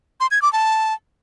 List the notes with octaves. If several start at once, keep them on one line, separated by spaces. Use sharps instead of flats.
C6
G#6
D6
A5